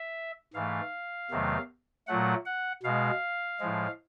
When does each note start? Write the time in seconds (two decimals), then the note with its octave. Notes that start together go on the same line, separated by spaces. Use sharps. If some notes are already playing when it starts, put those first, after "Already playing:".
Already playing: E5
0.54 G#2 E3 A3 F5
1.30 E2 C3 D#3 F#3 A3
2.07 A#2 F#3 A3 F#5
2.46 F#5
2.83 B2 G#3 F5
3.60 A2 F3 G#3